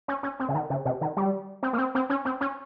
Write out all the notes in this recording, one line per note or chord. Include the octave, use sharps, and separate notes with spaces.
C#4
C#4
C4
C#3
D#3
C#3
C3
D#3
G3
C4
A#3
C4
C4
C#4
C4
C#4